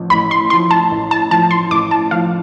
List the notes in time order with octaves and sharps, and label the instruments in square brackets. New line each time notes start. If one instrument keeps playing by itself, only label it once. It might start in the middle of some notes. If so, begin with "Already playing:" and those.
Already playing: [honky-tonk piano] A1 F3
[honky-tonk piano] A1 [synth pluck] B5
[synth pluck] C6
[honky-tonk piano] A2 [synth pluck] C6
[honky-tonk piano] F3
[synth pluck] A5
[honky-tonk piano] A1
[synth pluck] A5
[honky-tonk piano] A2 F3 [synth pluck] A5
[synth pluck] C6
[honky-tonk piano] A1 [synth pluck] D6
[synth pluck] A5
[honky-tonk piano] A2 F3 [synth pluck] F5